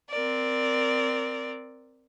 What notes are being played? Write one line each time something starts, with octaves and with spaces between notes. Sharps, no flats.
C4 A#4 D5